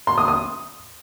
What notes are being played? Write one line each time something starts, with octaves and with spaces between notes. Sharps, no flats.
C6
D#6
D#6